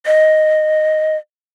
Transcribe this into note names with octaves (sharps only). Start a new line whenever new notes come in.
D#5